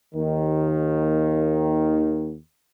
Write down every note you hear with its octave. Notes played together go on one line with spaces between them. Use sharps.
D#2 D#3